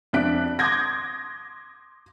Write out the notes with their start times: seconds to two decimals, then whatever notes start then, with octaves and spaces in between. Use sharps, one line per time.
0.13 F2 D4 E5 F#6 B6 D7
0.59 C6 D6 D#6 G6 G#6 A#6